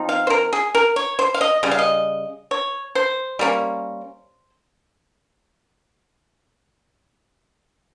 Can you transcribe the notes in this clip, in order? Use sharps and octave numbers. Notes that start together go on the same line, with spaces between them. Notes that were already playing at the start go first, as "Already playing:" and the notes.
Already playing: F3 C4 D#4
F5
C5
A#4
G#4
A#4
C#5
C5
F5
D#5
C#3 G3
F5
D#5
C#5
C5
G3 A#3 C#4